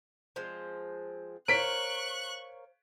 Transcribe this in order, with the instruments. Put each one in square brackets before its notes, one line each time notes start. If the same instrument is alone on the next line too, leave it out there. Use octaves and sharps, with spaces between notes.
[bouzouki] F3 G#3 C4
[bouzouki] A#4 [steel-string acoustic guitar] C5 C#5 F5 [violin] C#6 F#6 [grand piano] B6 D7